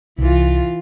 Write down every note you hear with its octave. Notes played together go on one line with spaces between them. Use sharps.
C2 E3 F4